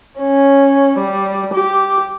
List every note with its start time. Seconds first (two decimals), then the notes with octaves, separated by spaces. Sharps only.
0.19 C#4
0.98 G3
1.54 G4